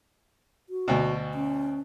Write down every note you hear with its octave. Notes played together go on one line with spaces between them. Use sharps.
F#4
D2 B2
C#4